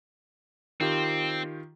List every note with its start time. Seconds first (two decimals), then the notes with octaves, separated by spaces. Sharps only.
0.81 D#3 C4 F4 G4